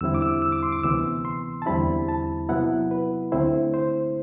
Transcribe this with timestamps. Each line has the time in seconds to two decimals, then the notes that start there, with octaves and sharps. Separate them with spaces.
0.01 E2 D3 G3 C4 E4 E6
0.14 D6
0.22 E6
0.42 E6
0.52 D6
0.63 C6
0.72 D6
0.83 D2 C3 E3 B3 E6
1.25 C6
1.62 A5
1.66 E2 D3 G3 C4 E4 B5
2.09 A5
2.49 C3 F#3 B3 E4 F#5
2.91 B4
3.32 D2 D3 A3 C4 E4 C5
3.74 C5